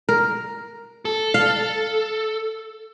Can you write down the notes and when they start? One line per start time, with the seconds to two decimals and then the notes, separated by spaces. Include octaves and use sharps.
0.09 A#4
1.05 A4
1.34 F5